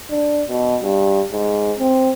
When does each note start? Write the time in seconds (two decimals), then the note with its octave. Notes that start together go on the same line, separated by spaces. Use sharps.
0.11 D4
0.48 B2
0.83 G2
1.32 G#2
1.78 C4